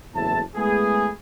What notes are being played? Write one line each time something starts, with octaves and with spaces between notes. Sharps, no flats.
F#1 E2 A2 E5 A5
G#3 A3 B3 E4 G#4